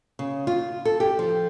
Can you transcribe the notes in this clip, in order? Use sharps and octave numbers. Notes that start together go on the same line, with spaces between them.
C#3
F4
A4
G4
F3